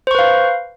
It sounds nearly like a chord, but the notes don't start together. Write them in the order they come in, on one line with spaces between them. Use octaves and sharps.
C5 C#6 B4 F5